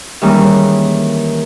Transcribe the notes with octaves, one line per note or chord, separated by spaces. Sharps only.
D#3 E3 G3 G#3 A#3 C#4